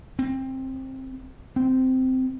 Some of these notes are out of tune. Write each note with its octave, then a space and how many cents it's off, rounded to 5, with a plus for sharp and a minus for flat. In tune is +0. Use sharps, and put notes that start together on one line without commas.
C4 +15
C4 -15